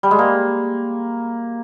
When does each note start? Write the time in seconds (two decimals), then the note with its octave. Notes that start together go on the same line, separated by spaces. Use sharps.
0.03 G3
0.11 G#3
0.19 A#3